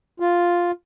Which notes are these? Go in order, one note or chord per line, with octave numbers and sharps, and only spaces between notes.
F4